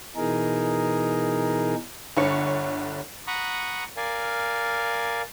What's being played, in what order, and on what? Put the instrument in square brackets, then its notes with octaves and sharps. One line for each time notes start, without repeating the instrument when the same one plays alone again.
[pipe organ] B2 E3 D#4 G#4 A#4
[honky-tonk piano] G1 D3 C#5 C#7
[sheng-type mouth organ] F#5 A#5 B5 C#6 D#6
A#4 D5 F5 G#5